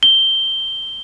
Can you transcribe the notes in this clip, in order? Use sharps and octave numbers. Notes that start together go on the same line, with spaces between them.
G7